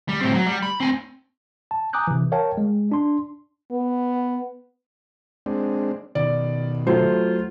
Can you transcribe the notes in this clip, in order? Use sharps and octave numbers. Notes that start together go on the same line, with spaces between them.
G3
A2 C4
F#3
G3
B5
C4 G#5
A5
G#5 A#5 D6 D#6 F#6 G6
C3 E3
A#4 C#5 F5 G5 A5
G#3
D4 C6
B3
G#3 C4 D4
B2 D#3 D5
F#3 A3 F4 C5